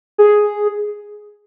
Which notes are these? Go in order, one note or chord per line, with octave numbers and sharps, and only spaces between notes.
G#4